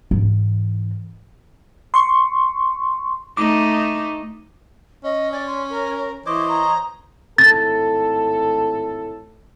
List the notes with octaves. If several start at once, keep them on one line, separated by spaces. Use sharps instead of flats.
G#2 E3
C6 C#6
A3 D#4 D6
C#4 D#5
D5 G#5
C6
A#4
E3 C5 C#5 D#5 D6
A#5
G#1 A2 A4 A6